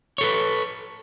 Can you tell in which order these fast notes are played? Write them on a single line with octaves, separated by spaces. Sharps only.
C#5 A4 B4